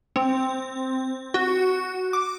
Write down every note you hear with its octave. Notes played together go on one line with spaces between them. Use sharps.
C4
F#4
D6